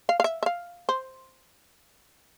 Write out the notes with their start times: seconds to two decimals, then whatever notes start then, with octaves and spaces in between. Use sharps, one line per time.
0.09 F5
0.20 F5
0.24 E5
0.43 E5
0.46 F5
0.89 C5